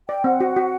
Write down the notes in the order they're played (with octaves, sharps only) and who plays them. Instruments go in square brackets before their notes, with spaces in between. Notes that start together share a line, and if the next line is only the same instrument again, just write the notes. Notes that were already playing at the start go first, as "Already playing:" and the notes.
[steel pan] D5 [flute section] G5
[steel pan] C4 [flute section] F#5
[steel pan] F#4
F#4